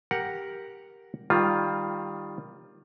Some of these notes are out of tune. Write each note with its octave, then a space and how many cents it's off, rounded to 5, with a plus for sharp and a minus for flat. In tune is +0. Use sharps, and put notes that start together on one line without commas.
G4 +0 A#4 +0 F#5 +0
D#3 +0 G3 +15 F4 +0